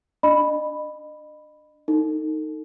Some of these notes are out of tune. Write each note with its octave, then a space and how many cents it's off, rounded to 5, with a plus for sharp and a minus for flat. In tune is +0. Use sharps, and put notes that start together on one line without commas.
D4 +0 D#5 -35 B5 +0
D#4 +0 A4 +35